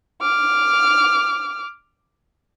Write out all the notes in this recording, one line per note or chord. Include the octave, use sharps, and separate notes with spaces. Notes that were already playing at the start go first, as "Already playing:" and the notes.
D6 F6